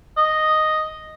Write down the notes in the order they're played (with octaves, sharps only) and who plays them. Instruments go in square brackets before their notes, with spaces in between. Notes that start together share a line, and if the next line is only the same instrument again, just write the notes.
[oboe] D#5